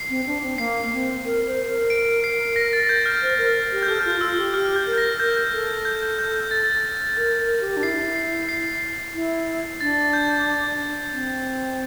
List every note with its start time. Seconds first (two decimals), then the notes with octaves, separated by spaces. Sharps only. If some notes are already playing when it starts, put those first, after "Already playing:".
Already playing: C7
0.10 C4
0.27 D4
0.43 C4
0.58 A#3 C7
0.92 C4
1.25 A#4
1.47 C5
1.69 A#4
1.90 D7
2.24 C7
2.56 A#6
2.73 A6
2.89 G6
3.06 F6
3.22 C5
3.38 A#4
3.72 G4
3.83 G6
3.87 A4 F6
4.05 F4
4.21 F4 E6
4.38 G4
4.54 G4 F6
4.76 G6
4.86 A#4
4.98 A#6
5.20 A#4 G6
5.53 A4
5.85 G6
6.18 G6
6.51 A6
7.17 A#4
7.40 A#4
7.60 G4
7.77 D4
7.83 E4 C7
8.16 C7
8.49 C7
9.15 E4
9.81 D4 A6
10.13 G6
11.12 C4